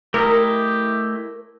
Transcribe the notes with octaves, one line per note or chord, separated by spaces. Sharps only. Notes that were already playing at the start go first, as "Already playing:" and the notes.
A3 E4 G4 A#4 D#5